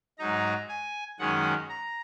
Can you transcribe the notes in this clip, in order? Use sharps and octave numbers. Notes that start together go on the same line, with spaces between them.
G#2 F#3 D#4 A#5
G#5
F#2 D#3 G#3 C#4 F#5
A#5